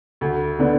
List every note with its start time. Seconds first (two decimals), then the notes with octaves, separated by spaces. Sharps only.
0.21 D2
0.58 D3 B3 D4